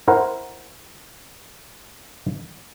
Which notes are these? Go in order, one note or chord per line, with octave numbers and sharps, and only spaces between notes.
E4 A#4 C5 F#5